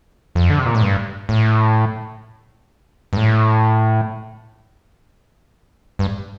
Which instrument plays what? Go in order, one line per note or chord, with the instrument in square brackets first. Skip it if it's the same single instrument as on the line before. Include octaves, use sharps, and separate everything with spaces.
[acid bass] F2
D3
C3
A#2
A2
G2
A2
G2
A2
G2